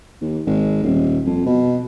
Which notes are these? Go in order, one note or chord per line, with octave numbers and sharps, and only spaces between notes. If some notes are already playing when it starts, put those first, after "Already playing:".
D#2
G#1
D#1
F2
B2